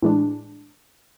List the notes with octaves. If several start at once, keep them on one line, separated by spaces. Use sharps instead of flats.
A2 E3 G#3 D4